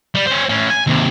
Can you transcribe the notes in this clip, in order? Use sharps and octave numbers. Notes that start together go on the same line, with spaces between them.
G3
C#4 C5
A2 C#4
G#5
D#2 C3